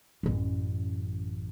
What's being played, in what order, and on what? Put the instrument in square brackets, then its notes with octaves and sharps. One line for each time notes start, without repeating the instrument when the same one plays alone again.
[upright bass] A1 F#2